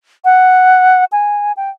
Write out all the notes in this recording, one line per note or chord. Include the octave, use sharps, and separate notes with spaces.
F#5
G#5
G5